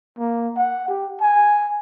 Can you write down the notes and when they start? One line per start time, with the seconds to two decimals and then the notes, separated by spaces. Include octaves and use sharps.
0.19 A#3
0.57 F#5
0.88 G4
1.21 G#5